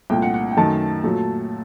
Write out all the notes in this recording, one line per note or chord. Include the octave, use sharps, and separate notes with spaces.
C2 A#2 A3 G5
F#5
F#5
G5
F#2 D#3 A3 A5
A#2 F#3 A3